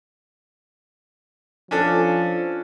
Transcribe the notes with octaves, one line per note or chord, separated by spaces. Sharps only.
F3 C#4 D4 A4